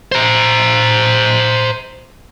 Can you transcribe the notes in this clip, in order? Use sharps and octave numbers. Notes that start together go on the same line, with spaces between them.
C5 A#5